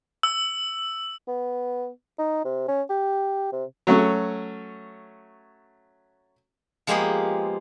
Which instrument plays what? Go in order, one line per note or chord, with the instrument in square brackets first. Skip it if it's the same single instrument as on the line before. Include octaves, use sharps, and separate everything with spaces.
[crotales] E6
[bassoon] B3
D#4
C3
C#4
G4
C3
[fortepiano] F#3 A3 C#4
[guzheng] F3 G#3 A#3 B3 G4 G#4